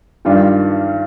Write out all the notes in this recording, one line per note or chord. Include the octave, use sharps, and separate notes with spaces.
G2 D#3 G3 D4 F4